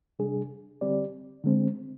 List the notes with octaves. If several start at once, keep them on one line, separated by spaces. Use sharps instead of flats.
C3 G3 D4 G#4
D3 G3 C4 G4 D5
D3 G#3 C4